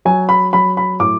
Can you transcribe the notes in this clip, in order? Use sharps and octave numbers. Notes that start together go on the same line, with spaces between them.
F#3 G#5
B5
F#3 B5
B5
A2 D6